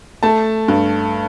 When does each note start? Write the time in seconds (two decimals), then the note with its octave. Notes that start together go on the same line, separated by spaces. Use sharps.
0.23 A3 A5
0.68 G2